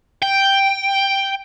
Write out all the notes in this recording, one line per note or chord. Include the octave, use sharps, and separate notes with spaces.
G5